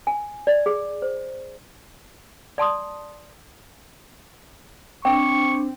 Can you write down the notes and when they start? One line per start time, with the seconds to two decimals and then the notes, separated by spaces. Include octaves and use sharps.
0.07 G#5
0.47 D5
0.66 G#4
1.02 C5
2.58 D5 A5 C6 D#6
5.05 C4 D4 G5 C#6